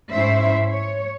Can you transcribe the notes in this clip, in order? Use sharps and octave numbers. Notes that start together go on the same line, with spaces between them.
G#2 C#4 E4 C5 E5
C#5